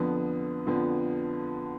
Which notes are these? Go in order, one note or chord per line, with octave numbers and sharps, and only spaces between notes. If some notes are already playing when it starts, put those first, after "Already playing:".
Already playing: F2 D3 F3 B3
F2 D3 F3 B3